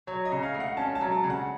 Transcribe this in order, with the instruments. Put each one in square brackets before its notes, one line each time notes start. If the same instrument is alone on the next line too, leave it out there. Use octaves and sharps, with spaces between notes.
[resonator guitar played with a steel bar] F#3 [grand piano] C#5
[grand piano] D#5
[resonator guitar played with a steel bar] C#3
[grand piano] F5
[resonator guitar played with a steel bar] A3
[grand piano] F#5
[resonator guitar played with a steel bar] C#4 [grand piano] A5
[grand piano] A5
[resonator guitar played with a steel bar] F#3
[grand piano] A5
[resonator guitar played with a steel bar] C#3
[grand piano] F#5